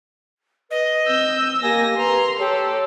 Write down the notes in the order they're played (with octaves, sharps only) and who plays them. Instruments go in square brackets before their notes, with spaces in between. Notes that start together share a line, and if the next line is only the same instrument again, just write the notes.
[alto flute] B4 [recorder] D#5
[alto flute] C4 [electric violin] E6 G6
[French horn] A#3 [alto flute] G4 [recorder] G#5 [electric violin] A#6
[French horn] B4 [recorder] A#5 [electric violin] C6
[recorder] G4 [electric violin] A4 [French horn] C#5